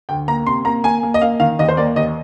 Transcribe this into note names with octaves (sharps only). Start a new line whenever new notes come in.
D2 G5
A#3 A#5
C3 C6
A#3 A#5
A#3 G#5
A#3
D#5
A#3 F5
D#3 F5
D#2 D#5
C5
A#3 D5
D#2 D#5